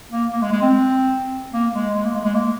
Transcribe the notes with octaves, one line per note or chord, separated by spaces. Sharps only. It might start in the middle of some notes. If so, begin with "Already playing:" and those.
A#3
A#3
G#3
G#3
C4
A#3
G#3
G#3
A#3
G#3
G#3
A#3